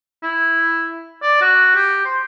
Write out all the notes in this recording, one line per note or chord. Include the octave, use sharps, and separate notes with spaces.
E4
D5
F#4
G4
C5